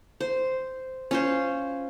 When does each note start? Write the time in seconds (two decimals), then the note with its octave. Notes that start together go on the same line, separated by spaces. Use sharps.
0.21 C5
1.11 C#4 F4 C5